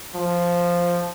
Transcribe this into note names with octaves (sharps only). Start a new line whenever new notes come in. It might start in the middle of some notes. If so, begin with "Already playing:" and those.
F3